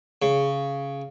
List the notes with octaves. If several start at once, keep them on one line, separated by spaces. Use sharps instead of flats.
C#3